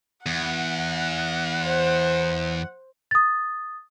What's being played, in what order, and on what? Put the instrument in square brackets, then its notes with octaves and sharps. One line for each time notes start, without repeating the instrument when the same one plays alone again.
[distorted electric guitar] E2 [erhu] F#5
[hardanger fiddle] C5
[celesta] D#6 A6